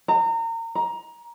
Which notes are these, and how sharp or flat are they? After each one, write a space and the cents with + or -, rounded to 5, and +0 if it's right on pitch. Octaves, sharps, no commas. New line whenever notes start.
A#5 -30
A#5 +20